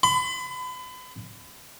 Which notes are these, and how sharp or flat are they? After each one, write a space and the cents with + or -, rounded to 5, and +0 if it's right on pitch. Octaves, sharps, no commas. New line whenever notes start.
B5 +35